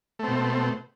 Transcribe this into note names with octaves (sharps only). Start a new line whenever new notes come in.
B2 A3 C4